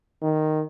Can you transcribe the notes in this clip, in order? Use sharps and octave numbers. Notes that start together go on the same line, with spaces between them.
D#3